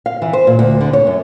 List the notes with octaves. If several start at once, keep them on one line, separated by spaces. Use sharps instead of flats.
F5
E3
C5
A#2
D2
D3
C#5
F#2